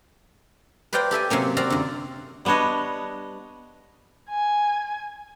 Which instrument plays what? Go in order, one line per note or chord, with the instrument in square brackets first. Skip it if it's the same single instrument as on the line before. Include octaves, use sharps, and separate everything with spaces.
[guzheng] B4 C5 D5 F5 G5 A#5
G4 A4 E5 G#5
C3 F#3 A#3 C#4
C4 F#4 D5 F5 A#5
F#2 D3
[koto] G3 B3 D4 C#5 D#5
[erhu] G#5